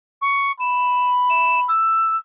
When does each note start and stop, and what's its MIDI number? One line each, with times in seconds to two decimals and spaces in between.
0.21 0.51 85
0.60 1.69 83
0.60 1.09 100
1.29 1.60 100
1.68 2.16 88